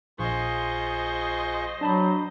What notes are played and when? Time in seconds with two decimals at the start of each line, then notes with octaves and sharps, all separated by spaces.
0.19 A#1 F4 G#4 C5 D#5 C#6
1.81 F#3 D4 A5 B5